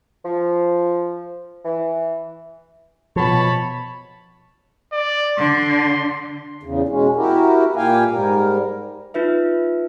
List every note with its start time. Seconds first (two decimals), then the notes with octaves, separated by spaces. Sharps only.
0.24 F3
1.64 E3
3.16 B2 F3 C#5 A5 B5
4.93 D5
5.38 D3 C6
6.63 E2 C#3
6.88 B2 G#3 C#4
7.16 E4 F#4 G4 A#4
7.76 A#2 A#3 G4 F5 G5 G#5
8.08 G#2 G3 A#4
9.14 D#4 F4 B4 E5